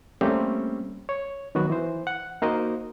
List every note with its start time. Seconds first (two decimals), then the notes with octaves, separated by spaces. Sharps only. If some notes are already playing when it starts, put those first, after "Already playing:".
0.21 G3 A3 A#3 C4 C#4 G4
1.09 C#5
1.55 D#3 F#3 B3 F#4
1.70 E3 C5
2.07 F#5
2.42 A#3 D#4 F#4 A#4 C5 D#5